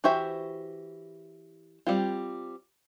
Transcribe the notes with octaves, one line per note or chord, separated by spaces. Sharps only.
E3 F#4 G4 C5 E5
G3 C4 F4